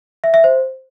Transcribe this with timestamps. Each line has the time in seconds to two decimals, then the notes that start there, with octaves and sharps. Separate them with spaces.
0.24 E5
0.34 E5
0.44 C5